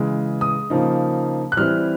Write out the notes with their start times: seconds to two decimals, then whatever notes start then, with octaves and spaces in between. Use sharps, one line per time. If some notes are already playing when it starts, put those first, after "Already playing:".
Already playing: C#3 E3 G#3
0.41 D#6
0.70 C#3 F3 A#3 D#4
1.52 F#6
1.57 E3 G3 C4 E4 F6